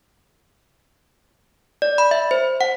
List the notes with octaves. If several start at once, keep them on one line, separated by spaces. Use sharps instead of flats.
D5
B5
E5
C5
F#5